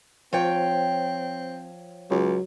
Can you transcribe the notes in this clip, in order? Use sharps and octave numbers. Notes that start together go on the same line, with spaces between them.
F3 C4 C#5 G5
C#2 F#3